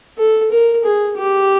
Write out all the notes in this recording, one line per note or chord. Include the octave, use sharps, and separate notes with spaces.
A4
A#4
G#4
G4